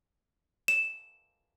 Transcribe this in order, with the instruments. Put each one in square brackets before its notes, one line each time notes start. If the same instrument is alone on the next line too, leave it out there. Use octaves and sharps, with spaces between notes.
[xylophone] E7